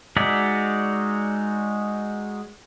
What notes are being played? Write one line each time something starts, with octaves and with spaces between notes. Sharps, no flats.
G#3 D#4 F#4 D5 E5